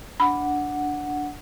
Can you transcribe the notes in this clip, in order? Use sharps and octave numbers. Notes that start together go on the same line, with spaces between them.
D4 F#5 B5